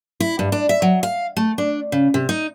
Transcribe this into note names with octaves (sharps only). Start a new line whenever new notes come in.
E4
G2
D4
E5
F#3
F5
A3
D4
C#3
C3
D#4